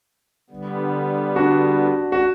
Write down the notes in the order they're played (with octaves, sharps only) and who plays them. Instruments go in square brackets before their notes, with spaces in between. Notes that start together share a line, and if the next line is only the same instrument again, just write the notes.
[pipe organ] D3 G3 B3
[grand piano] D4 F#4
F#4